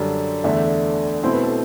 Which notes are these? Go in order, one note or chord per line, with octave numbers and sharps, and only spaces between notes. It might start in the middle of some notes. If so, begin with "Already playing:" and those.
Already playing: F#2 D3 G3 D4 D5
E2 D3 A3 D4 E5
B2 A3 C4 E4 C5
B4
A4